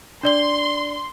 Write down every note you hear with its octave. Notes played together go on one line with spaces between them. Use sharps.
D4 D5 C6 G7